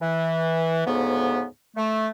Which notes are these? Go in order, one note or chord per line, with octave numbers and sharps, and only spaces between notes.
E3
D2 G#2 C#3 B3
A3